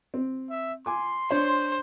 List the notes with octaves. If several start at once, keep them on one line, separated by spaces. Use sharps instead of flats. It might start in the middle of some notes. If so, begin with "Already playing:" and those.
C4
E5
G#5 C6 D6
D4 C5 C#5